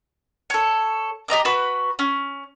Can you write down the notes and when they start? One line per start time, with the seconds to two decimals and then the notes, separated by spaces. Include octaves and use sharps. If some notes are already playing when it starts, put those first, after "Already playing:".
0.50 A4 C#5
1.28 G4 D#5 A#5 D6
1.45 F#4 B4 B5
1.99 C#4